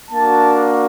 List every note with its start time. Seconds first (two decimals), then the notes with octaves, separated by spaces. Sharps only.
0.11 A#3 D4 F#4 A5